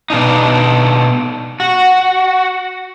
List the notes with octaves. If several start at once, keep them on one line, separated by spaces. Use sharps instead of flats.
B2 D4 D#4
F#4